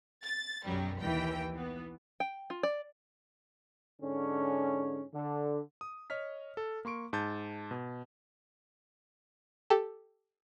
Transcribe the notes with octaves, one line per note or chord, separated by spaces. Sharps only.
A6
B1 F#2 F#3 G3
D#2 E3 G5
E3 B3
G5
F4
D5
G#2 D3 C#4
D3
D#6
C#5 D#5 F6 B6
A4
A#3 C6 C#6 D7
G#2 A5 G6 A6
B2
G4 A4